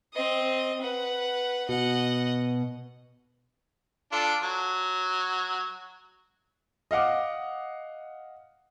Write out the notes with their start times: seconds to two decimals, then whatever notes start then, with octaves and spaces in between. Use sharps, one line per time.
0.13 C4 D#5
0.82 B4 F#5
1.69 B2 D#5 F#5
4.12 D4 F4 A4
4.43 F#3
6.91 D#5 F5 F#5 D6